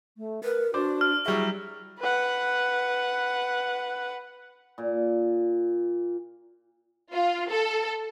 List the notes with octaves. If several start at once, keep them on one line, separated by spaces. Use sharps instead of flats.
A3
A#4 B4
D4 F#4 C5 D5 D6
F6
F#3 G3 E4 G#4 C#6
B4 F#5
A#2
F4
A4